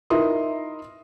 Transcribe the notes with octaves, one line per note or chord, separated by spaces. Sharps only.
D#4 E4 A#4 E5 C6 D#6